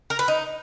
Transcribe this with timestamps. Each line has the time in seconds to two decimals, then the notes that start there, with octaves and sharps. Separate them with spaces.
0.10 A#4
0.19 B4
0.28 D#4